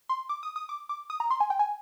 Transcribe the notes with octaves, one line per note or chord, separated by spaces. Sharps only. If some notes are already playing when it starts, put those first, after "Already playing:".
C6
D6
D#6
D#6
D6
D6
D#6
A#5
C6
G#5
G5
G#5